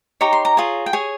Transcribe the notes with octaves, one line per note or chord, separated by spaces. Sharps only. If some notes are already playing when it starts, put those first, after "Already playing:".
D#4 G4 C#5 A#5
C6
A#5
F4 G#4 C#5
G5
G#4 C#5 G#5